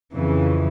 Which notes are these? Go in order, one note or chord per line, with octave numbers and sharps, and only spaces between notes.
F2 C#3 E3